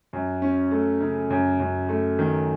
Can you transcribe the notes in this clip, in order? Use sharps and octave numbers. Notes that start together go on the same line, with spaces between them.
F#2
C#4
A3
C#3
F#2
F#2
A3
D#3